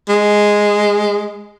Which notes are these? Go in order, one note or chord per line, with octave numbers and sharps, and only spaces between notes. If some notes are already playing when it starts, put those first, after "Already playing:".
G#3